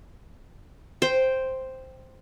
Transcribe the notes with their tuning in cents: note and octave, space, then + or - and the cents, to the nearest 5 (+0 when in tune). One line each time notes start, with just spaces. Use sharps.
C5 +0 G5 +0